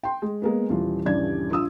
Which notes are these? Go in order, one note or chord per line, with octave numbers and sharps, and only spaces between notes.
G5 C6
G#3
G#3 A#3 B3
D#1 E3 F4
D#1 G2 C#3 E3 D5 G#6
A#1 F4 D#6 E6